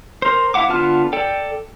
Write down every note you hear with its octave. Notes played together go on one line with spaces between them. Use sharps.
A#4 C5
E4 F5 F#5 D6
D3 B3 F4 A5 F6
A4 D5 G5